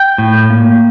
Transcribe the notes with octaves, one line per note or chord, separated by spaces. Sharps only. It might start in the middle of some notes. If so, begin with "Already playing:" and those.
Already playing: G5
A2
A#3